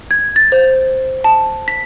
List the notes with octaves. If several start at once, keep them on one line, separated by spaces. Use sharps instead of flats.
G#6
A6
C5
A5
B6